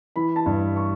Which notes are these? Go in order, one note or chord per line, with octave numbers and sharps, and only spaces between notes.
E3 B5
A5
G2
C#6